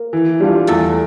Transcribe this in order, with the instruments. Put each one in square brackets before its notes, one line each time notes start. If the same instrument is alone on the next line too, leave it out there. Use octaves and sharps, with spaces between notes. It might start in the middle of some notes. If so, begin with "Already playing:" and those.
Already playing: [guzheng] A#3 A#4
[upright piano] E3
G3 D4 F4
[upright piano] E2 [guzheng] A3 A4